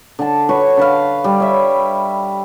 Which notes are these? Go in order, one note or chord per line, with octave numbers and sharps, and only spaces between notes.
D3 A5
F#4 B4 C#5
D3 B4 F5
G3
C#5 E5